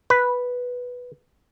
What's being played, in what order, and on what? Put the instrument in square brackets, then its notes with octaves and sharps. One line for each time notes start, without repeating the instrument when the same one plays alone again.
[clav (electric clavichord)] B4